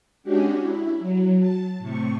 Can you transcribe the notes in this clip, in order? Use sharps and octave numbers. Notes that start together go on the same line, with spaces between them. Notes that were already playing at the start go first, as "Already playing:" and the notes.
G#3 C#4 D4 F#4 G4
E4
F#3
A5
A2 C3 C#6